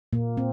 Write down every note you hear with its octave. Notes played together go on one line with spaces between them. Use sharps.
A#2 A#3
C4